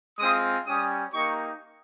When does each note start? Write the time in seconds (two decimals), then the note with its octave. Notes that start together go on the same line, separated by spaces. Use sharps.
0.18 G#3 C4 F4 D#6
0.66 G3 C#4 G4 D#6
1.13 A#3 D#4 G4 C#6